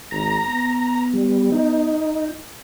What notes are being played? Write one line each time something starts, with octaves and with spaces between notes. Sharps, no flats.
G#1 A#5
B3
G3
D#4